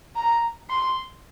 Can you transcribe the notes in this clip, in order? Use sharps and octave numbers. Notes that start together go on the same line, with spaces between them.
A#5
C6